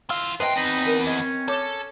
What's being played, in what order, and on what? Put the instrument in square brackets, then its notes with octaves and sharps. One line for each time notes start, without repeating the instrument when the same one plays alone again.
[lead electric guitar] E3 F4 [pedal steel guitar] F5 E6 F6
[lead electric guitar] F2 G5 [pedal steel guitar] B4 D#5 [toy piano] C5 E5 A5 [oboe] C6
[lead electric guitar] E2 B4 [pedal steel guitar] C4 [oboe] D#4
[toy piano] A#4
[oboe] C#4 [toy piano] D#5
[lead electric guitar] A4 [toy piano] C#5 D6